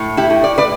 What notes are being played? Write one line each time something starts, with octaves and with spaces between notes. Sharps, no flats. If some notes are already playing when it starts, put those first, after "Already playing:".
Already playing: A2
E4 G4
A2
D5
B4 D5